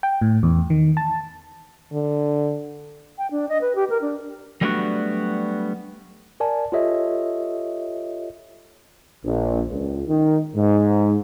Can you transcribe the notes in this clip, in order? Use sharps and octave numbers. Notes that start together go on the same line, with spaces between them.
G5
A2
E2
D#3
A5
D3
G5
D4
D#5
B4
G4
A#4
D4
F#3 G3 A3 B3 D4 F#4
A#4 D5 G#5 A5
F4 G4 A4 C#5 D#5 E5
A#1
C#2
D#3
G#2